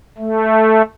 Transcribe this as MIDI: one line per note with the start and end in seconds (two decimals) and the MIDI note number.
0.18 0.82 57